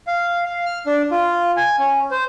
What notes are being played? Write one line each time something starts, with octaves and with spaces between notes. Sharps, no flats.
F5
F5
F6
D4
F4
G#5
C#4
C5